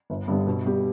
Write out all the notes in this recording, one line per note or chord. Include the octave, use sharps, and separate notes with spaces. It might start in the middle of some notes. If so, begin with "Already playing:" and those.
G1
G2 D3 G3 B3
B2
G3 B3 G4